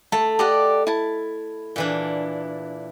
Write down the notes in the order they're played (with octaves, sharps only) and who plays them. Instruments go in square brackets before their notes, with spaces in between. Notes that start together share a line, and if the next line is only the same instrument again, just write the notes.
[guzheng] A3 [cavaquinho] A5
[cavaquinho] G4 D5 F#5 [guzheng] D#5
[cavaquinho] E4 A5
[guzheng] A#2 E3 D4